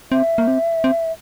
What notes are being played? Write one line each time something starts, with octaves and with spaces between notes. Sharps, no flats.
C4 E5
A#3
C4
C4